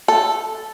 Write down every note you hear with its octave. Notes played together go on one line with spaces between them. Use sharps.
A4